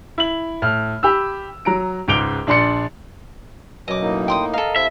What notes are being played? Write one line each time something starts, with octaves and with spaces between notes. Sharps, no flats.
E4 F#7
A2 F6
G4 B5 E6
F#3 A#5 D7
C#2 G#2 D6 D7 F7 G7
A#1 D4 D5 C6 C#7
F#2 B2 F#3 D#5 D6
A2 A#3 D#4
G5 C6 D#6
A4 A#4 D#5 F5
C3 E4 E5